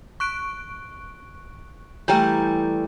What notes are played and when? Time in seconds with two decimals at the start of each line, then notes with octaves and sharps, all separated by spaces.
0.20 C#6 F#6 D7
2.08 E3 G3 A3 G5 A#5 G6